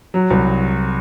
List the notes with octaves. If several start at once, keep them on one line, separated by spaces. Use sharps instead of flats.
F#3
C2